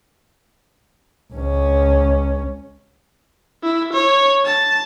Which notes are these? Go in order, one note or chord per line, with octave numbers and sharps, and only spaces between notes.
C#2 C#4
E4
C#5
A5